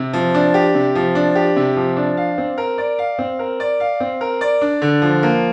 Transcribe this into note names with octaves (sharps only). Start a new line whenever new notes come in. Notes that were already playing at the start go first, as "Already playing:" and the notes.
Already playing: C3
F3
D4
G4
C3
F3
D4
G4
C3
F3
D4
F5
C4
A#4
D5
F5
C4
A#4
D5
F5
C4
A#4
D5
D4
D3
F3
A#3